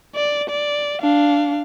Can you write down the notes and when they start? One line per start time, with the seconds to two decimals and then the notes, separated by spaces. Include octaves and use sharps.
0.15 D5
0.50 D5
1.01 D4 F5